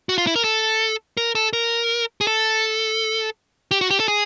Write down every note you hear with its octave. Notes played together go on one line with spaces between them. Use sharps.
F#4
F4
E4
A#4
A4
A#4
A4
A#4
G#4
A4
G4
F#4
G4
A4
G#4